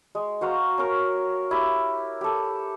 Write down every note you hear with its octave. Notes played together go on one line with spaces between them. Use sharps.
G#3
F#4 C5 F5 A#5
C#4 A#4 C#5
E4 G4 E6
G4 A4